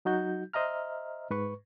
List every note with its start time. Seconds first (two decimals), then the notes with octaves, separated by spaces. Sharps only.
0.05 F#3 D#4 F#4 G6
0.53 C5 D#5 E5 A#5 F6
1.30 G#2 B4 C#6